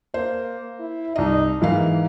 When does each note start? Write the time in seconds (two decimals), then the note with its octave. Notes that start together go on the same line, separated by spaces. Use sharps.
0.14 A#3 C5
0.80 E4
1.16 C2 D#4 D#5
1.61 G#2 E3 A#3 F5